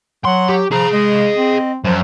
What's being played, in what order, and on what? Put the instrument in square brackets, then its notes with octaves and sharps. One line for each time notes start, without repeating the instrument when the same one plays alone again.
[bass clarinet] F#3 [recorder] F#5 [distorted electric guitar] C6
[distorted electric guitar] G4
[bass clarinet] F3 [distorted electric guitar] G#4 F5 [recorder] A#5
[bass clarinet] G#3 [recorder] D#5
[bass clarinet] C4
[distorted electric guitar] F#2 [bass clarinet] F3